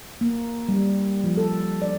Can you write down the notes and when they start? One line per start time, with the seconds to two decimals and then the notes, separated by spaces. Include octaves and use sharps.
0.21 A#3
0.69 G3
1.24 F3
1.37 A4
1.82 D5